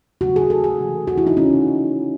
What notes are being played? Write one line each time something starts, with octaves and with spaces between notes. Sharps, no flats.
C#3 F#3 A3 F#4
G#4
A4
G#4
C3 E3 G#3
F#4
E4
D#4
C#3 G#3 C#4